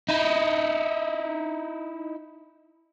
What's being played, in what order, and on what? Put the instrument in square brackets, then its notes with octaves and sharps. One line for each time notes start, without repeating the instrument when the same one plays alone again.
[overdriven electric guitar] D#4 E4